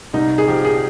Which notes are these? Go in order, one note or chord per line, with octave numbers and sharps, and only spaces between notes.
C2 D#4
G#4
F3 G4
G#4